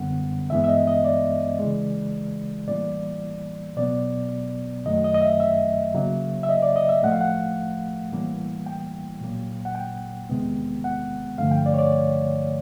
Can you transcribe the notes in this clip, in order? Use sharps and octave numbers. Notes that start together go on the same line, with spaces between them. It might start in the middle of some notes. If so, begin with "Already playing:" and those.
Already playing: F#2 D3 G3 B3 F#5
G2 E3 G#3 B3 E5
E5
D#5
D#5
D5
C#3 E3 G#3
A2 E3 G3 A#3 D5
B2 F#3 B3 D5
F#2 D#3 F#3 A3 D#5
D#5
D#5
E5
E5
C#3 F#3 A#3
E5
D#5
D5
D#5
E5
A2 F3 A3 F#5
F5
F#5
A2 E3 G3 A#3
G5
A#2 F#3 A#3
F#5
G5
E2 C3 D#3 G#3 B3
F#5
G2 D3 F3 A3 F5
G5
D5
C#5
D5